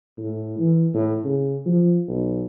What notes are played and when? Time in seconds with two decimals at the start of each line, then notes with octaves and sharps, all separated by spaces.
0.17 A2
0.59 E3
0.94 A2
1.24 C#3
1.66 F3
2.08 B1